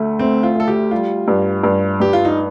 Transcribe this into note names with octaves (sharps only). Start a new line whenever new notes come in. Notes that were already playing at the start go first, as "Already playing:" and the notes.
Already playing: D2 A3
A3 C4
F4
A3 A4
G4
G3 F4
G2
G2
G2 G4
F4
D#4